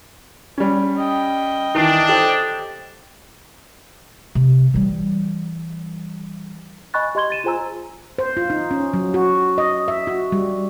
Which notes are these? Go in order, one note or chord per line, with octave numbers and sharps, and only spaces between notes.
G3 C#4
D#5 G5
D#3 E3 D4
G4 A4 C5
C3
E3 G3
D#5 G#5 B5 C#6 F#6 A6
G4 D#5 C6 G#6 G7
A6 D#7 E7
F4 G#4 C5 G#5 A#5 E6
C5
F4
D#4
C#4
F#3
F#4
D#5
E5
F#4
G3